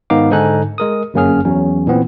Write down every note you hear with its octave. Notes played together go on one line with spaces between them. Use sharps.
G#2 D#3 B3 D#4 F5 D6
G#2 D3 D#4 A4 G#5 F#6
G#3 A#4 D#6
G1 F#2 A#3 C#4 G#4 F6
E2 F#3 C#4
A#2 E3 B3 C4